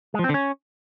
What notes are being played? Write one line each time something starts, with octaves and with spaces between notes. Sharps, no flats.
G#3
F3
C4
D3
C#4